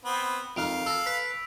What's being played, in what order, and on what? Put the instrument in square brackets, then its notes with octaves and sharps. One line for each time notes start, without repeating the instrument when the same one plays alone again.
[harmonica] B3 C4
[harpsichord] F2 D#3 [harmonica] F5 [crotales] D7 F7
[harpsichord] A4 [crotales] E6 A#6
[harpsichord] B4 [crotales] B6